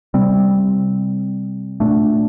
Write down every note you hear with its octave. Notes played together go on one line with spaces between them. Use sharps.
C3 G3 C4
A#2 A3 D4